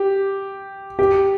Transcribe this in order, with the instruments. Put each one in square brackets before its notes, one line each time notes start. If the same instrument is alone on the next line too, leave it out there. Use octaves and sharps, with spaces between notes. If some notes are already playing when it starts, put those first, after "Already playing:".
Already playing: [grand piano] G4
G4